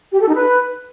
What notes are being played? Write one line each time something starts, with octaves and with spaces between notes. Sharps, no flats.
G4
A4
D#4
B4